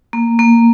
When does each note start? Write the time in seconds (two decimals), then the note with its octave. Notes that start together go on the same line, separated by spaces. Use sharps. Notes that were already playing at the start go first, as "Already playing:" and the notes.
0.13 A#3
0.39 A#3